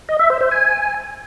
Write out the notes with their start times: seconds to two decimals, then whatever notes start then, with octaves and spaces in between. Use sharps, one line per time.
0.09 D#5
0.19 E5
0.30 C5
0.41 C5
0.51 G#5